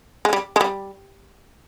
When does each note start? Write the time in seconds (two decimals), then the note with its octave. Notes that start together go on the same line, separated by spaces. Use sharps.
0.25 G#3
0.33 G3
0.56 G#3
0.61 G3